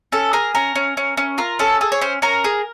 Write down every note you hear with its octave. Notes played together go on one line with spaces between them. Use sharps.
C#4 A4
G#4 A#4
C#4 A#4
C#4
C#4
C#4
F4 A#4
C#4 A4
G#4 A4
C#5
C#4 C5
C#4 A#4
G#4